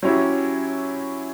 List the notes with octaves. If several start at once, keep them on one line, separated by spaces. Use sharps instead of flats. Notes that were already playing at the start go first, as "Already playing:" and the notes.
F#3 C#4 E4 G4